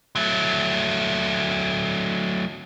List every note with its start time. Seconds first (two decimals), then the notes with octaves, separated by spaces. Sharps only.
0.16 F#3 A3